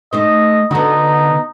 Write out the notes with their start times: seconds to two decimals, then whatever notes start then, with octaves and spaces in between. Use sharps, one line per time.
0.13 A3 D#4 C5 D#5
0.71 D3 B3 D#4 E4 F#4